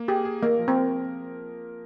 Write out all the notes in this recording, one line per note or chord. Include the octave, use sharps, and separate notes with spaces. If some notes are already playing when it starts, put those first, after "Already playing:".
Already playing: A#3
G4 G#4
G#4
A#3 A#4
F3
C4
A#4